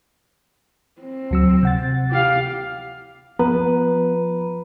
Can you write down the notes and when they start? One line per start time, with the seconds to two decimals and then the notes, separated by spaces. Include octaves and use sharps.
1.01 C4
1.31 D2 F#3 E6
1.63 C3 F#5 A6
2.11 G4 F5
3.39 F3 B3 B4 A#5